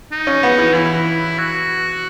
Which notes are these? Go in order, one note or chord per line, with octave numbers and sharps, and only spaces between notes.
D#4
C#4
B3
E3
E3 E4
F#4